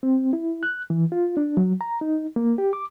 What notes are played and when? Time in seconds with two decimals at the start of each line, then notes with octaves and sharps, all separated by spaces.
0.03 C4
0.33 E4
0.63 F#6
0.90 E3
1.12 F4
1.37 D4
1.57 F#3
1.81 A#5
2.01 D#4
2.36 A#3
2.58 G4
2.73 D6